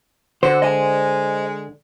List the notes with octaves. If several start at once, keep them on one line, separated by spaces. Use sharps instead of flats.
D3 F#4 C5
G#3 D#5 G#5